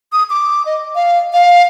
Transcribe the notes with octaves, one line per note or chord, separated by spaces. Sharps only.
D#6
D6
D#5
F5
F5